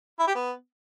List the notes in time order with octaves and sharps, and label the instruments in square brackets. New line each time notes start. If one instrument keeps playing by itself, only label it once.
[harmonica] E4
G4
B3